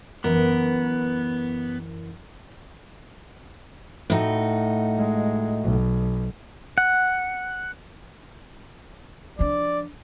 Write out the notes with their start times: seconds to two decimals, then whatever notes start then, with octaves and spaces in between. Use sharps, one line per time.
0.24 F#2 E3 B3 A#4
4.10 A2 D#4 F#4
4.97 G#3
5.63 B1
6.78 F#5
9.39 F3 D4 D5